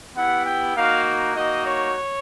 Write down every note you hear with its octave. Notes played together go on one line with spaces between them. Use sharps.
B3 E4 G4 F#5
G5
A#3 D#4 F#4 F5
A#3 D#4 F#4 D#5
C#5